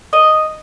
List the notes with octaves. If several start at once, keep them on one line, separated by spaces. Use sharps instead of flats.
D#5